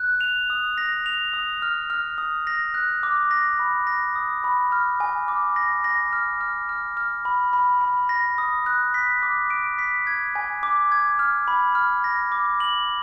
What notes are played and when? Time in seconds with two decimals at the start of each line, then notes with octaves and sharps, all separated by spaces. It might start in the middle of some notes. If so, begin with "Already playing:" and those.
Already playing: F#6
0.21 F7
0.50 D#6
0.78 A#6
1.06 F7
1.33 D#6
1.62 F6
1.90 F6
2.18 D#6
2.47 A#6
2.74 F#6
3.03 D6
3.31 A#6
3.59 B5
3.87 A#6
4.15 D#6
4.44 B5
4.72 F6
5.00 G#5
5.28 D6
5.56 A#6
5.84 A#6
6.13 F6
6.41 F6
6.69 F6
6.97 F6
7.25 B5
7.53 B5
7.81 B5
8.09 A#6
8.38 D#6
8.66 F#6
8.94 B6
9.23 D6
9.50 D7
9.79 B6
10.07 G#6
10.35 G#5
10.63 D6
10.92 G#6
11.19 F6
11.48 B5
11.75 F6
12.04 A#6
12.32 D6
12.60 F#7